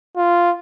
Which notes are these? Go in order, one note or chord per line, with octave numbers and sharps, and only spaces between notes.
F4